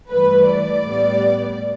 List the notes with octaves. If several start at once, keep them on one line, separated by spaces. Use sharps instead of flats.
G2 E3 A3 B4
D5
A2 G3 B3